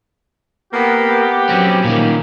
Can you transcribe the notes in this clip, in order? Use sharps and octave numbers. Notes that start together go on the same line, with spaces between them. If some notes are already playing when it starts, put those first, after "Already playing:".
A#3 B3 G4
B3
F#3 C4 C#4
A#2 D#3 A#3